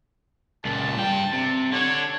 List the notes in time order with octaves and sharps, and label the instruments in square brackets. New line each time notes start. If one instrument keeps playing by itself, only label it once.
[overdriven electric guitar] C#2 A#2 [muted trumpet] A5
[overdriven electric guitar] G2 G5
C3
[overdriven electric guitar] D3 D4 [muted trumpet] C#5